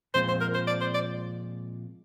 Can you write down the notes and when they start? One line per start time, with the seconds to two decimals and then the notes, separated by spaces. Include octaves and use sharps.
0.14 A#2 F3 G#3 C4 F4 C5
0.28 C5
0.41 A#4
0.54 C5
0.67 D5
0.81 C5
0.94 D5